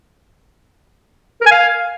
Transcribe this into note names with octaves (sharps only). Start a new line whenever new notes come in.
A#4
G#5
F5